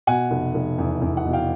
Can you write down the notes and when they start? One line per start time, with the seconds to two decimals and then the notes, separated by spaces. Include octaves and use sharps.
0.07 B2 F#5 G#5
0.31 F1
0.54 F1
0.78 E2
1.02 E2
1.17 F#5
1.25 B2
1.33 F5 G5